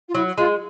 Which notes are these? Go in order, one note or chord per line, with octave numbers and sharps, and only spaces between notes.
F4
F#3 E4
G#3 F4